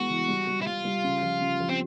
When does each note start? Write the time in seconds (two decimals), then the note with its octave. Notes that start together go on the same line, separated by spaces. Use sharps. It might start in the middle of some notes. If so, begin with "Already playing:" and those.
Already playing: E3 G#3 B3 F#4
0.10 E3
0.28 G3
0.47 G3
0.61 E4
0.66 G3 F4
0.85 G3
1.04 C#3
1.22 F3
1.41 C#3
1.60 F3
1.69 C4